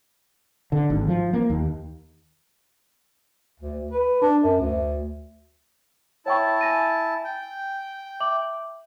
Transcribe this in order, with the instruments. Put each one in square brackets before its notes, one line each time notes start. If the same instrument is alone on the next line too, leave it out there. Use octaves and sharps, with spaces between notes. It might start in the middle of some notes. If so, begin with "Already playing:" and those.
[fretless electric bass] D3
G#1
F3
A#3
D#2
[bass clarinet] D2
B4
D4
F#2
D2
[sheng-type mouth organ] E4 A5 [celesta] C#5 G5 C#6
[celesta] G#5 A#6 D#7
[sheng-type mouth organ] G5
[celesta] E5 D6 F#7